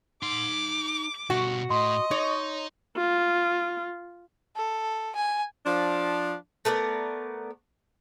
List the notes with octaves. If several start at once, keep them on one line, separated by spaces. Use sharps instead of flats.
D#4 C6 D6
B2 G3 F#4
A2 D#5 C6
D#4 C#5
F4
A4
G#5
F3 D4
A3 B3 A#4 D5